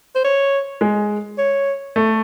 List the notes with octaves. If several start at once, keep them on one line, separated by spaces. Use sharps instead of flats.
C5
C#5
G#3
C#5
A3